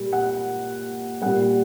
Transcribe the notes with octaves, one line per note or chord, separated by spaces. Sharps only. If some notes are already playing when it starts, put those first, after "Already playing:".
Already playing: A#2 G3
F#5
A#2 G3 F#5